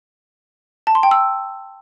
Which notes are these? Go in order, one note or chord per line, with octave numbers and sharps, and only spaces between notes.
A5
C6
G5
E6